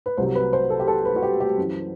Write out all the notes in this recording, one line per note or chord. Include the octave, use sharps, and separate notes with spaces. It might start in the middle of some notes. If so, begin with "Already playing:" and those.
B4
C2 C3 F#3 C5
B4
C5
A4
G4
A4
B4
F#4
G4
G4
F#2 E3